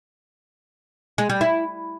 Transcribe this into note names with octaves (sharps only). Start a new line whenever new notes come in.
G#3
G3
E4